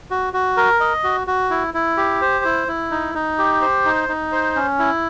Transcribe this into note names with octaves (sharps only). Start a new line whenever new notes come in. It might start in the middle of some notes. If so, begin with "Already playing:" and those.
F#4
F#4
A#4
D#5
F#4
F#4
E4
E4
G4
C5
E4
E4
D#4
D#4
G4
C5
D#4
D#4
C5
C#4
E4